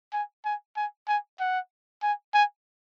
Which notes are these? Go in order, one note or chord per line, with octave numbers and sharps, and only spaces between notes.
G#5
G#5
G#5
G#5
F#5
G#5
G#5